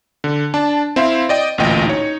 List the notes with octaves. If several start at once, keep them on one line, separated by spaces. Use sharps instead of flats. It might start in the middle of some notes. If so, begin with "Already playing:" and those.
D3
D4 A5
C4 E4 E5 F5 C6
D5 D#5 G5 D#6
A1 D2 A#2 D#5 G5
D#4 C#5